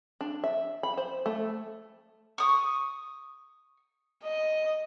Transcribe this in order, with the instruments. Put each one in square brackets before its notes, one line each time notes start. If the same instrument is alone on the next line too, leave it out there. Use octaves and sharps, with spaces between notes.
[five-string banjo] D4
E5
B5
C5
A3
[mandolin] C#6 D#6
[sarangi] D#5